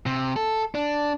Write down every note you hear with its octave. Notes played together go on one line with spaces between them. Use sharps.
C3
A4
D4